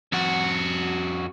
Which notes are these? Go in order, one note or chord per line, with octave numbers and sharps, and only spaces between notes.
F2 F#4